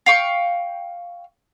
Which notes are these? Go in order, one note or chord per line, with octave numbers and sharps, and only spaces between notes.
F5 G5 C#6